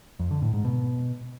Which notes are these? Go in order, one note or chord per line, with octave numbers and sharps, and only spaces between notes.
F2
D3
A2
G#2
B2